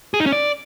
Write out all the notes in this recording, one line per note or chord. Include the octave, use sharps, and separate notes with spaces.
G#4
D#4
C#4
D5